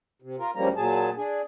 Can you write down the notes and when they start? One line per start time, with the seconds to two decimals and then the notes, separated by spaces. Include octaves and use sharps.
0.22 C3
0.39 F4 A#4
0.55 D2 C#3 F3 G3 A#3 A#5
0.76 A#2 F#3 G#4 A5
1.17 D4 G#4